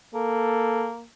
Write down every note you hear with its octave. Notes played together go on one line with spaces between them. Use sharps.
A#3 A4